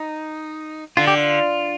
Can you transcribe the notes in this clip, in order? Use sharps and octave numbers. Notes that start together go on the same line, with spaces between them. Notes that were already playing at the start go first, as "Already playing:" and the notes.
Already playing: D#4
D3 F4
G4
F4